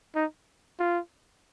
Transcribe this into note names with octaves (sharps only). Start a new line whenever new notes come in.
D#4
F4